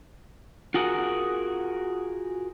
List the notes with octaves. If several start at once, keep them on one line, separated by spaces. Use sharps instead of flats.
F4 F#4 G#4 A#4 E5 F#5